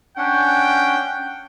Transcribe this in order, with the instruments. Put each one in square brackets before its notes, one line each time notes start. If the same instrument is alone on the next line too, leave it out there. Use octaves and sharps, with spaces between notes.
[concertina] C#4 D4 F#5 [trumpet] G5